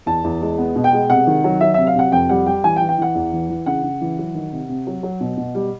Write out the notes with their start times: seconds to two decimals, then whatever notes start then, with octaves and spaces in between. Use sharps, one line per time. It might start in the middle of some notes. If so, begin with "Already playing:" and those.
0.06 E2 A5
0.24 E2
0.41 G#3
0.58 B3
0.76 B2
0.84 G5
0.93 G#3
1.10 C3 F#5
1.27 D#3
1.44 F#3
1.61 F#3 E5
1.74 C3 E5
1.87 F5
1.95 C3 F#5
2.12 F2 G5
2.29 G3 F#5
2.46 G3 G5
2.64 E3 G#5
2.76 G5
2.81 E3
2.89 G5
2.98 E3 F#5
3.15 E2
3.32 E3
3.49 E3
3.66 C#3 F#5
3.83 C#3
4.01 E3
4.18 F#3
4.35 D#3
4.52 C3
4.69 C3
4.87 F#3
5.03 F#3
5.20 B2
5.37 B2
5.55 G3